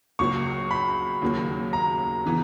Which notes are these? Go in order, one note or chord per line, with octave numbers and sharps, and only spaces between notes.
C#2 C#3 F#3 A#3 C#6
B5
D#2 C#3 F#3 A#3
A#5
C#3 E3 B3